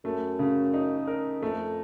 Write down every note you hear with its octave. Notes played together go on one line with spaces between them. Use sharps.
F#2 A3
C#3
D#4
A#4
F2 A3